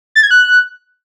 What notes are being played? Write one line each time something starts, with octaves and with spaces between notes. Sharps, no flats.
A6
G#6
F#6